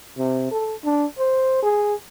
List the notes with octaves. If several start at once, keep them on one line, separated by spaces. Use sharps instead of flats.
C3
A4
D4
C5
G#4